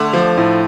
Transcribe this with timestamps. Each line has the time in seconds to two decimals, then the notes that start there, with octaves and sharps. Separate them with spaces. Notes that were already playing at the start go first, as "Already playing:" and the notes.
Already playing: D3 A3
0.13 F3
0.37 A2